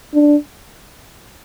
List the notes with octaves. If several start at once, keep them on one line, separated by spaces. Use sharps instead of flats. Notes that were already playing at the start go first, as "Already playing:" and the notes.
D4